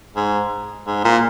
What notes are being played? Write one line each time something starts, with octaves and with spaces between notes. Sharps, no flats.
G#2
G#2
A#2